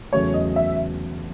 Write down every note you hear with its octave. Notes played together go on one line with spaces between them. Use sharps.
E2 C#3 F#3 A3 C#4 C#5
D#5
E5